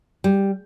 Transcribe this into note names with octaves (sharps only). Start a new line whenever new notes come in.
G3